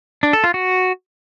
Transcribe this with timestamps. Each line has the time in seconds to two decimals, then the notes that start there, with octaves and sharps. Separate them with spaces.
0.23 D4
0.33 A4
0.44 F4
0.54 F#4